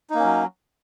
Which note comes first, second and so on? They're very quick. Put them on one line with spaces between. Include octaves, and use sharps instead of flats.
D#4 A#3 C#4 F#3